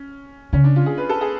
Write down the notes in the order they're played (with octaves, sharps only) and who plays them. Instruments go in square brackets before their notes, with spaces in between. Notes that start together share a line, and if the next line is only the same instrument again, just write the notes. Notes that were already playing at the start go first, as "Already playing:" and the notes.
Already playing: [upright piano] C#4
[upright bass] C#3 [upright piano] C#4
[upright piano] D4
F4
G#4
B4
A4
G#4